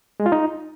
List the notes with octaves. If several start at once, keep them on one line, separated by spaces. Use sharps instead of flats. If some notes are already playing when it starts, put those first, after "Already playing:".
G#3
F4
D#4